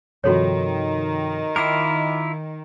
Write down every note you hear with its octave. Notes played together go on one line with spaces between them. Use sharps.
G2 C3 D#3 F3 F#4 A4 C#5
E4 F4 A#4 D#5 D6